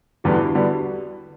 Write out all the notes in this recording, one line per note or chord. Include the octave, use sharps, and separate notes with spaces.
E2 D3 G3 B3 F#4
E4
D4
D3 G3 B3 F#4